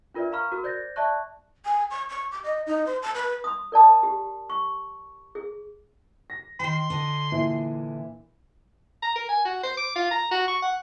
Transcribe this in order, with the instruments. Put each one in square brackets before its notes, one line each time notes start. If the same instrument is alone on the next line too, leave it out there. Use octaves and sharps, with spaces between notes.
[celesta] D4 F4 A#4 B4 D5 E5
F5 A#5 B5 C#6 F6
F#4 A#4
C5 D5 G6 A6 A#6
D5 E5 A5 C#6 F#6
[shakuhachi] G#5
C#6
C#6
D6
D#5
D#4
C5
A5
B4
[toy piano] C6 D#6
A#4 D5 A5 D#6
G4
C#6
G#4
[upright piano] A#6
[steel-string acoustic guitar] D#3 G5 [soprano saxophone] C6
[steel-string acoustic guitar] D3 D#5
[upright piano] A#2 E3 E4
[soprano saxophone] A#5
A#4
G#5
F#4
C5
D6
F4
A#5
F#4
C#6
F#5